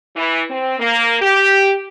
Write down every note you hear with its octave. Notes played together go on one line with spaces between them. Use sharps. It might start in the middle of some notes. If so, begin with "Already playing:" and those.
E3
C4
A#3
G4